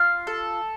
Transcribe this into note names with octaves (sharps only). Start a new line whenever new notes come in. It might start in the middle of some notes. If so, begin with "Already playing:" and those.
Already playing: F4 F5
A4